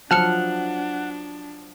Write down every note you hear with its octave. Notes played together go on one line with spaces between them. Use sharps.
F3 F#3 D4 F#5 A5 F6 C#7 F7